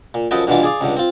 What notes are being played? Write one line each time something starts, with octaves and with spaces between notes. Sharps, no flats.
A#2
F#2 F3 A4 B4 D#5 G5
G2 B2 D3 E3 F4
G#4 D5 F5
C#2 G2 D3
C4 F4